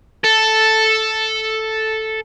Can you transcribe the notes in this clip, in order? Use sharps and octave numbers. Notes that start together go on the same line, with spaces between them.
A4